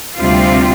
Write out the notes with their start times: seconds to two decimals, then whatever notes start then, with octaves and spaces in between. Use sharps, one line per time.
0.17 D2 C3 G3 C4 F4